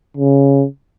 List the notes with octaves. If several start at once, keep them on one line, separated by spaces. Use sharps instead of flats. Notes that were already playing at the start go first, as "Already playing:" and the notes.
C#3